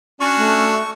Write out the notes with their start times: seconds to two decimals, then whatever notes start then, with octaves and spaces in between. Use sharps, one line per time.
0.21 C#4 D4 F#4 C#6
0.37 A3